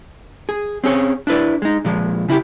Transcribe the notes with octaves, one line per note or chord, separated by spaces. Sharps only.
G#4
C4 C#4 G#4 C#5
D4 E4 B4 D5
G#3 D#4
A#2 F3 G#3
C#3 E4 F#4 G4